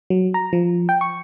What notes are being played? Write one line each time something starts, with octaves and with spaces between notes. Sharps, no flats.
F#3
A#5
F3
G5
C#6